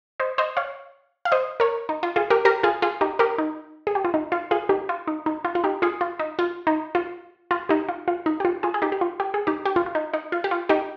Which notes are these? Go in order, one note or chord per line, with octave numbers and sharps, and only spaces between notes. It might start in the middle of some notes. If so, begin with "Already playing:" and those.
C5 D#5
C5 D#5
C#5 F5
F5
C5 D#5
A#4 C#5
D#4
F4
F4 G#4
G4 A#4
G4 A#4
F4 G#4
F4 G#4
D#4 G4
G4 A#4
D#4
G#4
G4
F4
D#4
F4
F4 G#4
D#4 G4
F4
D#4
D#4
F4
F4
D#4 G4
F4 G#4
F4
D#4
F4
D#4
F4
F4
D#4 G4
F4
F4
D#4
G4
F4
F4 G#4
G#4
D#4 G4
G4
F4
G4
G#4
D#4 G4
G4
F4
F4
D#4
D#4
F4
G4
F4
D#4 G4